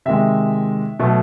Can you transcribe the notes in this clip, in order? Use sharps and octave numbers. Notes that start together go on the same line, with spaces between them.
C3 D#3 G#3 E5
B2 F#3 A3